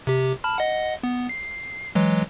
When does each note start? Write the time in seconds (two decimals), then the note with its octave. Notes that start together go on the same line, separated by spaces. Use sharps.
0.07 C3 G4
0.44 A5 B5 F6
0.58 D#5 F#5
1.03 B3
1.29 C7
1.95 E3 F#3 G#3